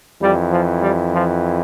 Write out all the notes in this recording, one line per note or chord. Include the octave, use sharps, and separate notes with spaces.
F2 E3 G3
F3
G3
F3